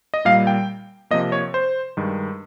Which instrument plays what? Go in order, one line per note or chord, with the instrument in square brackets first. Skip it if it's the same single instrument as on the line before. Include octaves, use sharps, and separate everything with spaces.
[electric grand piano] D#5
A#2 G3 A#3 F5
G5
C3 F3 A#3 D#5
C#5
C5
G2 D#3 G#3